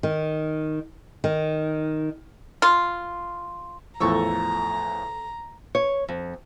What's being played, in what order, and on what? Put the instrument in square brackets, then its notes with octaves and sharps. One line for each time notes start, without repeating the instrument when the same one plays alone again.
[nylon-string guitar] D#3
D#3
[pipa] F4
[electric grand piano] E2 A2 F3 [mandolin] A4 C#6 E6 [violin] A#5
[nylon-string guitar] C#5
F2